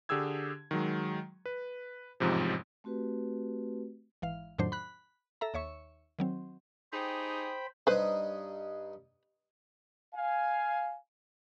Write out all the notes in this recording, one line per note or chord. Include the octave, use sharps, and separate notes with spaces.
D3 G4 G#4 E6 G#6
D#3 F#3 G#3
B4
A1 F2 G#2 C3 F3
A3 C4 F#4 G4 B4
G#1 E3 F5
F2 A2 D#3 F#3 D4 C5
B5 F#6
A4 E5 A#5
D#2 C#5 E5 C#6
D#3 F#3 C4
D#4 G4 G#4 C5 G5 B5
G2 D#4 B4 C5
F5 G#5